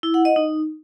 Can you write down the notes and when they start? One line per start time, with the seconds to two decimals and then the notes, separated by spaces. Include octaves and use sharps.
0.03 E4
0.14 F#5
0.25 D#5
0.36 D#4